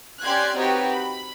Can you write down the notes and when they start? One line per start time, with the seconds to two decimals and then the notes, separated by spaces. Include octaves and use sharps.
0.23 C#4 G4 D5 C6 F#6 G#6
0.56 C4 D#4 F#4 G4 B4 C#5
0.92 B5